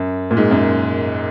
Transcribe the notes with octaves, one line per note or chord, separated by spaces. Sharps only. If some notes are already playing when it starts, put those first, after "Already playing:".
Already playing: F#2
A#2
G#2
F#2